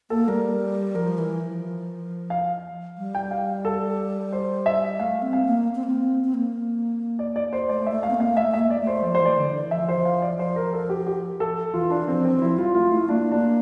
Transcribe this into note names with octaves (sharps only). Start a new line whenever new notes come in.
A#3 A4
G3 A#4
F3 A#4
E3
F3
F5
G3
G5
F5
A4
C5
E5
A3 F5
C4
F5
A#3
C4
A#3
C4
C4
A#3
D5
D5
C5
A3 D5
A3 E5
F5
C4
A#3
F5
A3 E5
A3 E5
A#3
D5
A3
C5
F3 D5
C5
E3 D5
D3
E3
F3 E5
C5
F5
D5
F3 C5
A#4
A4
G4
G4
A4
E3 F4
D4
F3 C4
C4
E3
F3 E4
G3 F4
A3 F4
A3 E4
A#3 D4
D4